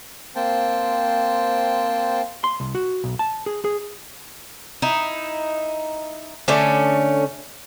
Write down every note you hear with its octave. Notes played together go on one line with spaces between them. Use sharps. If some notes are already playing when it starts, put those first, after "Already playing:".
A#3 C4 C5 G5 A5
C6
C2
F#4
B1
A5
G#4
G#4
D#4 E4
D3 A3 C#4